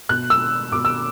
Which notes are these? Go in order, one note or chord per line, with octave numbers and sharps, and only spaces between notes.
B2 F#6
E6
B2 D6
E6